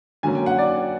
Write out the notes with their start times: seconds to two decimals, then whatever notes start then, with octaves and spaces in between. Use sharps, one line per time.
0.23 D3 F#3 A#3 C#4 G#5
0.35 G5
0.46 F#5
0.58 D5